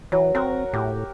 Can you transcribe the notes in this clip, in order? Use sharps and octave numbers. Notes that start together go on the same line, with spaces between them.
E3 F#3
C4 A#4 F#5 C#6
A2 G4